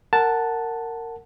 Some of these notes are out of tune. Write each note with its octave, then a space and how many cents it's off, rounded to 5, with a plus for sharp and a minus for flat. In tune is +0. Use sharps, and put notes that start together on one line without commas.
A#4 -20 F#5 +0 A5 +0